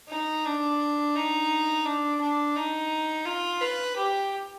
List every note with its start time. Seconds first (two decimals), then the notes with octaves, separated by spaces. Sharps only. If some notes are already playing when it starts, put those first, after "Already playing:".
0.09 D#4
0.45 D4
1.15 D#4
1.85 D4
2.21 D4
2.56 D#4
3.26 F4
3.61 B4
3.97 G4